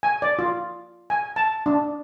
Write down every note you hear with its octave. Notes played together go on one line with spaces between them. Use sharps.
G#5
D5
F4
G#5
A5
D4